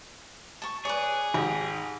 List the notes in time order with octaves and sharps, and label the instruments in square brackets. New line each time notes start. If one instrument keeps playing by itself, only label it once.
[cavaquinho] A5 C#6
[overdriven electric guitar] G#4 [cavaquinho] B4 C#5 [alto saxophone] D5
[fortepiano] G#1 [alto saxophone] D#4 [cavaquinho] G4